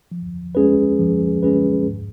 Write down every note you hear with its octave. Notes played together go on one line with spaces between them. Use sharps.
F3
G#3 C#4 G#4 B4
F3
G#3 C#4 G#4 B4
G#2